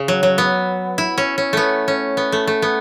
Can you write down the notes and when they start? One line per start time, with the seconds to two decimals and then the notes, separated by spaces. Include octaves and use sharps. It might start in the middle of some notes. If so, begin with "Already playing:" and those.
Already playing: C#3
0.08 F#3
0.23 F#3
0.38 B3
0.98 E4
1.18 C#4
1.38 C#4
1.53 A3 B3
1.88 C#4
2.17 B3
2.32 A3
2.47 A3
2.62 B3